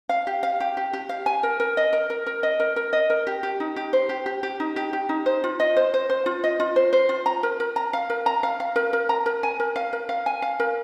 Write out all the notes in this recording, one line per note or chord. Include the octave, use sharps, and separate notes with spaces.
F5
G4
F5
G4
G4
G4
F5
G#5
A#4
A#4
D#5
A#4
A#4
A#4
D#5
A#4
A#4
D#5
A#4
G4
G4
D#4
G4
C5
G4
G4
G4
D#4
G4
G4
D#4
C5
F4
D#5
C5
C5
C5
F4
D#5
F4
C5
C5
F4
A#5
A#4
A#4
A#5
F5
A#4
A#5
F5
F5
A#4
A#4
A#5
A#4
G#5
A#4
F5
A#4
F5
G#5
F5
A#4